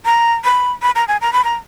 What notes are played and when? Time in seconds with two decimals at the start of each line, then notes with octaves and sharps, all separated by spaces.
0.05 A#5
0.44 B5
0.82 B5
0.96 A#5
1.08 G#5
1.21 A#5
1.33 B5
1.44 A#5